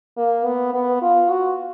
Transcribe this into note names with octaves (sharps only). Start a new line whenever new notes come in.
A#3
B3
B3
F4
F#4